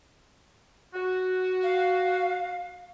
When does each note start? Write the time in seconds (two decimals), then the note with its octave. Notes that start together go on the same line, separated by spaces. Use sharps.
0.94 F#4
1.63 F5